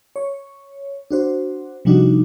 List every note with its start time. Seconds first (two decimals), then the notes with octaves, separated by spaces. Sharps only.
0.16 C#5
1.11 D4 F#4 C5
1.85 C3 F3 G3 D4 D#4 F#4